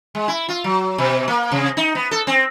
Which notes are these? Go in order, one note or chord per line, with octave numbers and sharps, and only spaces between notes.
G#3
E4
F4
F#3
B2
A#3
C3
D#4
B3
A4
C4